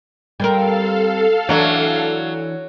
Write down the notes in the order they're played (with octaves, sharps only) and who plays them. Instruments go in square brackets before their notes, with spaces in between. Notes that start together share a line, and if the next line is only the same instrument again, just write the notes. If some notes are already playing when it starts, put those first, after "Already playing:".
[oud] G3 C4 A#4 [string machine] A4 F5
[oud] E3 D4 C#5 [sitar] F#3